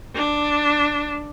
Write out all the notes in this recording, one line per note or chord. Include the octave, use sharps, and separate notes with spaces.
D4